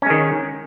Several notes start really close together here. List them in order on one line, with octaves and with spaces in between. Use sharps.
C#4 G#3 D#3